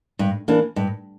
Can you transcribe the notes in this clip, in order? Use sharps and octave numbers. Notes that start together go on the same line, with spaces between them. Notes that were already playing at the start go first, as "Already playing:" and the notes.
G2
E3 A#3 D4
G2